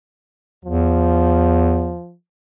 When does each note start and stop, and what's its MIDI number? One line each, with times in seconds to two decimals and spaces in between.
0.65 1.97 40
0.65 2.14 53